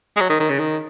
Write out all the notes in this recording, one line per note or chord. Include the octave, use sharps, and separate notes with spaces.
G#3
F#3
D#3
D#3
C#3
D#3